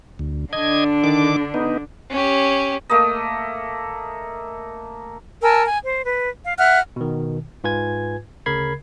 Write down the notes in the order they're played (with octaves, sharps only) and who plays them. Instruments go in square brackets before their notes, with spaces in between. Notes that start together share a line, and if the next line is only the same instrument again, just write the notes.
[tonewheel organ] D2
[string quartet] D3 D4 [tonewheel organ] D#5 G#6
[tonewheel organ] D#3 D6
B3 D#4
[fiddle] C#4 G4
[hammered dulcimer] A3 A#3 D#5
[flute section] A#4 G#5 A5 E6
G#5
C5
B4
F5
E5 F#5 F6 F#6
[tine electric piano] B2 D#3
G#2 F4 B4 G#5 G#6
D2 C#3 A#4 B5 G#6 C7